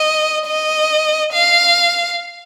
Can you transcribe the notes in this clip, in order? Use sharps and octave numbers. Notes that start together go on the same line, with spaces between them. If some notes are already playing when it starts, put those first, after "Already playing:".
Already playing: D#5
D#5
F5